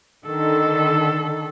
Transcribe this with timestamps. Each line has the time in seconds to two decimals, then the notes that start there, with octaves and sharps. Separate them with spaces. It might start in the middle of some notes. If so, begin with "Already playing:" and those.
0.24 D3 D#3 A4